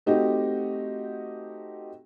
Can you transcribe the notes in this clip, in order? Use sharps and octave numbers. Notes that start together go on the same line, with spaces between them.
A3 C4 D#4 F#4 G4